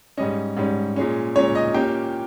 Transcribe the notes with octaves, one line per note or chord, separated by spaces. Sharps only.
G#2 G3 C#4 D#5
G#2 G3 C#4
A#2 G#3 C#4
A#2 G#3 C#4 C#5
D#5
A#2 A#3 C#4 G4 G5